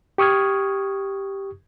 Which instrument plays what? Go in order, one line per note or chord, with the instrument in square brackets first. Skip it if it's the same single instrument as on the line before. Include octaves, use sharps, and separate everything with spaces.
[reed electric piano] G4 C#6 D#6 F6 G#6